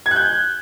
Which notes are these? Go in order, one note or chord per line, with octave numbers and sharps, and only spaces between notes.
G#6
F#6
G6